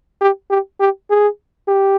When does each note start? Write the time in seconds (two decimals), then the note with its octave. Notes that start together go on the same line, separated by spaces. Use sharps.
0.21 G4
0.50 G4
0.80 G4
1.10 G#4
1.68 G4